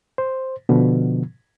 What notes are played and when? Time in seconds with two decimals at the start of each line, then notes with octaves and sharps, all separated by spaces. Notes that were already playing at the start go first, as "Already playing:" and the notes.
0.18 C5
0.69 B2 D3 F3